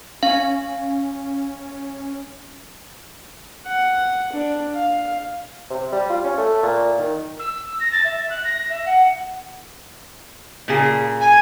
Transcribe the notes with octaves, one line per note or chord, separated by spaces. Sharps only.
C#4 F5
F#5
D4
F5
C3
G3
F4
C#4
A3
A#2
D#3
E6
A#6
A6
E5
F#6
A#6
E5
F#5
A#2 C#3 G#4
G#5